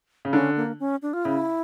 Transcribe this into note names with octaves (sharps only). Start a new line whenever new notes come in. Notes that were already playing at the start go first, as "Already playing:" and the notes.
C#3
D3 C#4
A#3
C#4
D4
F4
C#3 E4